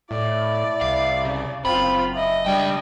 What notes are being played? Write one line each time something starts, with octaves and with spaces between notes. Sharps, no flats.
A2 E4 D5
C2 F5
C#3
F#1 C4 F4 B5
D#5 E5
C#2 G3 D4 G5